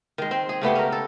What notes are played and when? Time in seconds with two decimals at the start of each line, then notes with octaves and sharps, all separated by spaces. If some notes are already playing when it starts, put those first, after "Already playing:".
0.18 D#3 G#3
0.31 C4
0.49 G#4
0.62 C#3 A3 B3 G4
0.75 C#4 A#4
0.92 A4